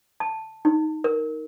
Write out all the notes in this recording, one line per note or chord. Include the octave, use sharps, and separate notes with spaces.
A5
D#4
A#4